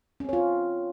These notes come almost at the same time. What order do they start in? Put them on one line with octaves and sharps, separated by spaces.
C#4 C4 C#5 F4